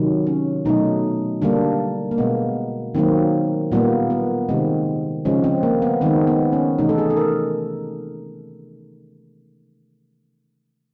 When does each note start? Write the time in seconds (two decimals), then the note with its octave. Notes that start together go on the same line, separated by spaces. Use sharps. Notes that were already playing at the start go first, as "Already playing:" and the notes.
Already playing: C3 D#3 F#3
0.27 C#4
0.65 B2 F#3 A3 D#4
1.42 D3 G3 A#3 D4
2.11 A#3
2.18 B2 G#3 B3
2.95 D#3 F#3 A#3 C4
3.72 A#2 G3 A#3 B3
4.10 B3
4.49 C3 D#3 G#3 C4
5.25 C#3 F3 G#3 C#4
5.44 C4
5.63 A#3
5.82 B3
6.01 D#3 G#3 C4
6.27 B3
6.53 C#4
6.78 C3 E3 A3 D#4
6.89 A4
6.98 G#4
7.10 A4
7.17 A#4